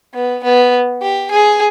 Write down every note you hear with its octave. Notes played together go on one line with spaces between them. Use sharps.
B3
B3
G4
G#4